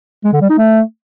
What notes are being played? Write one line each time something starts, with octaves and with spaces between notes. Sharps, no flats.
G#3
D3
G3
D#4
A3